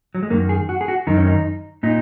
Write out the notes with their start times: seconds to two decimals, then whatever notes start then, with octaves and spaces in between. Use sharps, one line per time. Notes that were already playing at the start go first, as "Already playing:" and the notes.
0.15 F#3
0.23 G#3
0.30 F#2 D#3 A#3
0.49 G#4
0.69 F#4
0.81 G#4
0.88 F#4
1.07 F#2 D#3 D#4
1.17 C#4
1.27 D#4
1.83 A#2 D#4